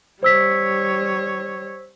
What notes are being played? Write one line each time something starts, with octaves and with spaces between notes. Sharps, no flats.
G3 C5 C#5 E6 B6